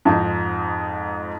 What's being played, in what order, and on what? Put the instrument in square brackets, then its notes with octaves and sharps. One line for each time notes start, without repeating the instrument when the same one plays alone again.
[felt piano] F2 G#2 D#4